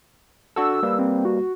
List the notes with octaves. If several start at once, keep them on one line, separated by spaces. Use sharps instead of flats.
D4 F#4 A4 E6
G3 A#3 B4
C4
F#4